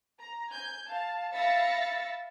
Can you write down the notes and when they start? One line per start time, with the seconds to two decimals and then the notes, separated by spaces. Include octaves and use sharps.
0.19 A#5
0.51 G#5 G6
0.89 F5 A5
1.34 E5 F5 B5 A6 A#6 C#7